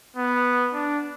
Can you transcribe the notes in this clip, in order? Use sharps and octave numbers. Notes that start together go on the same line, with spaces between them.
B3
D4